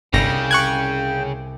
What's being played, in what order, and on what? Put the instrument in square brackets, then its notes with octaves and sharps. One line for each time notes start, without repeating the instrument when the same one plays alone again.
[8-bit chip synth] G1 A#6 [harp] C2 C#7 [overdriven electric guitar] C#3 [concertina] G5
[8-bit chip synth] C#6 F#6 G#6